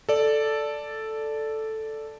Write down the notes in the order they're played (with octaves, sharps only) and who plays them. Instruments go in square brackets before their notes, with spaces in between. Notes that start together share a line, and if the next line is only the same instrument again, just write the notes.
[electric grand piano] A4 D5